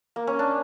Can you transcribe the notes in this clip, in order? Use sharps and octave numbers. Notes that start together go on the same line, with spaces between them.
A#3
C#4
D4